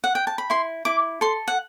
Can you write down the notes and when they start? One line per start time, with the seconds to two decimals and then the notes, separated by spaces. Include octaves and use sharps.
0.04 F#5
0.15 G5
0.27 A5
0.38 B5
0.50 E4 C6
0.85 E4 D6
1.21 A4 C6
1.48 F#5